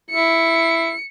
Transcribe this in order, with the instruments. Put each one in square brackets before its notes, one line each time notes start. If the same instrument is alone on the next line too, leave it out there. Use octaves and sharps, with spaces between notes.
[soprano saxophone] E4 [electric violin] C#7